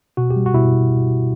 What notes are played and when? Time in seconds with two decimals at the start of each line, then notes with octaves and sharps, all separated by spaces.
0.17 B2 F#4
0.31 G4
0.36 G3
0.46 F#4
0.54 B2 E4